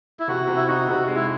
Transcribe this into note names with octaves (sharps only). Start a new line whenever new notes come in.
E4
C3 F#4
C3
E4
D#4 F#4
C3
G#3
E4